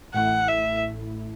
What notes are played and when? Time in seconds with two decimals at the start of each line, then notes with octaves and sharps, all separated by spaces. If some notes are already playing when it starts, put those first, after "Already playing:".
0.14 A1 A2 A3 E4 F#5
0.48 E5